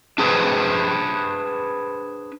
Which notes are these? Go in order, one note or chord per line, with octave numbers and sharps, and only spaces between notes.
D4 G#4 B4 C5